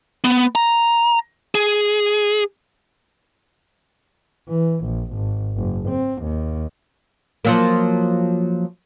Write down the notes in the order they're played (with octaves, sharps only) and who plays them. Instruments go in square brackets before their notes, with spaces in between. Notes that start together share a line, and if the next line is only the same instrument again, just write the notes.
[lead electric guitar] B3
A#5
G#4
[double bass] E3
A#1
G#1
F#1
C4
D#2
[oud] F3 F#3 A#3